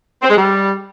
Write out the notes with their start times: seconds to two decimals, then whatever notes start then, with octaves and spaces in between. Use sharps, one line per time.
0.22 C4
0.30 G#3
0.37 G3